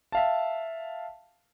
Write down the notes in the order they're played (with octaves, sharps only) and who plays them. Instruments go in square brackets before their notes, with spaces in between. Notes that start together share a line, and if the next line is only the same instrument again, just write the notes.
[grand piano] E5 F5 A5